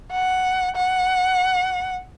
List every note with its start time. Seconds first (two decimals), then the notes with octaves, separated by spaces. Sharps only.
0.12 F#5
0.76 F#5